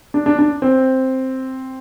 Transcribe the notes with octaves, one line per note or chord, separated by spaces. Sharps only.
D4
D4
D4
C4